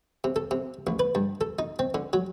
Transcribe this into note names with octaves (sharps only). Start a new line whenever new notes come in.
C3
A4
C3
A1
B4
G2
A4
D#4
C4
D3
F#3